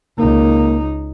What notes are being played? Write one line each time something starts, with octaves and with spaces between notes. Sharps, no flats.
C#2 A#3 D#4